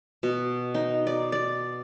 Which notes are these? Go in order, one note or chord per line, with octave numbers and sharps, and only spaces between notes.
B2
D#4
D5
D5